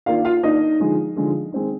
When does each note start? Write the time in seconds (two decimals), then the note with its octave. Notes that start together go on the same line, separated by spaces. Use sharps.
0.06 D#3 A#3 D4 F4 F5
0.25 F4 F5
0.43 D#3 A#3 D4 D#4 D#5
0.79 D3 F3 G#3 D#4
1.16 D3 F3 G#3 D#4
1.52 D#3 G#3 C4 D#4